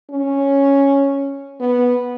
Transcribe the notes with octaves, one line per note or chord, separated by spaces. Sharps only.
C#4
B3